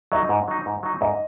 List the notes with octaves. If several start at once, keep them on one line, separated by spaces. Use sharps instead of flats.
F#3 D#4 D#5
G#2
F#3 D#4
G#2
F#3 D#4
G#2 D#5